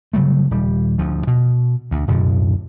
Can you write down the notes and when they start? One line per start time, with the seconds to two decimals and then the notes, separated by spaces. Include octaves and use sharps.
0.13 C#3 F#3 G3 A3
0.51 D#1 G3
0.98 D2 F3
1.27 B2
1.91 D2
2.07 D1 F#2 B2 D3